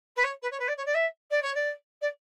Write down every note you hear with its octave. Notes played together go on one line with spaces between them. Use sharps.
B4
C#5
B4
C#5
B4
D5
C#5
D5
E5
D5
C#5
D5
D5